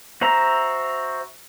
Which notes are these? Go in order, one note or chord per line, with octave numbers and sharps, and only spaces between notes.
F#4 C5 E5 A#5